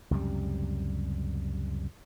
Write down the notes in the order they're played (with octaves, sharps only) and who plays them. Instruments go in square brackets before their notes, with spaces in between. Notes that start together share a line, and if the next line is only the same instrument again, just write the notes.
[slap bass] C#2 F#2 C3 G3